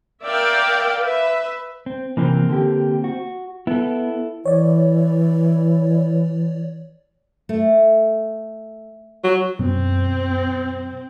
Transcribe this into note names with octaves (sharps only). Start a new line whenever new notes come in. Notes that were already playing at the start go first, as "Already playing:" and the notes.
A#4 D5 E5 F5 G5
B4 E5
C4
C3 E3 A#3 C4
D3 G4
F#4
B3 E4 A4
E3 C#5 D5
A3
F#3
F#2 B2 C4